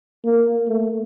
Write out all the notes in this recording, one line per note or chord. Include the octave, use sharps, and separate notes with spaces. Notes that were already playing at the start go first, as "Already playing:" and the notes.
A#3
A3